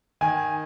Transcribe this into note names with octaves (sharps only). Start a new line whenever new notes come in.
D#3 G#5